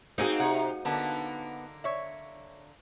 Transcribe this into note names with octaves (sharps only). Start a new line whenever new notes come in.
A#3 C4 D#4 F#4 G#4
C3 F#5
D3 A#3 B3 A5
C#5 E5